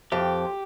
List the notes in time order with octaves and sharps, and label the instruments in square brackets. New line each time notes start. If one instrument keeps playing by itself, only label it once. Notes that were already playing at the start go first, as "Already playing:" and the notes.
[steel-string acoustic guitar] F2 [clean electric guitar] G4